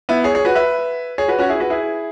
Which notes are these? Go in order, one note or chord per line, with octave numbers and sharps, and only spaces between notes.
B3 E4
G#4 C#5
G#4 C#5
F#4 B4
B4 E5
G#4 C#5
F#4 B4
C#4 F#4
E4 G#4
F#4 B4
E4 G#4